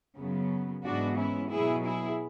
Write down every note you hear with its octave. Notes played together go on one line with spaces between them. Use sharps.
F#2 C#3 F#3 B3
G#2 E3 G#3 B3 D4 F#4
C#4 E4
B2 F#3 B3 E4 G#4
E4 G#4